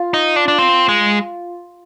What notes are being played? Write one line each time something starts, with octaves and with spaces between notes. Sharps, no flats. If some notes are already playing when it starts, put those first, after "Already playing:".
Already playing: F4 F5
D#4
D4
D4
C4
G#3